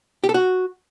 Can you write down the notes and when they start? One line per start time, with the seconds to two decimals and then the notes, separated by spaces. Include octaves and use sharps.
0.24 G4
0.29 A4
0.34 F#4